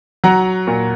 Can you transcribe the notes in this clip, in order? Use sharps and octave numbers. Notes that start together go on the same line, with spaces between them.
F#3 F#5 A#5
A#2